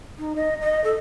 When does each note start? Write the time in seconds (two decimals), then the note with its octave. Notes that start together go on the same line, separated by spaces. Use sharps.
0.19 D#4
0.36 D#5
0.61 D#5
0.84 A4